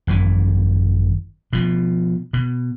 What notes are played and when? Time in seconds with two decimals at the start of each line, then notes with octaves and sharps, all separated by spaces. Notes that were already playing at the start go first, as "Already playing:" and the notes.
0.07 G#1 F#2 E3
1.53 B2 F3
2.33 B2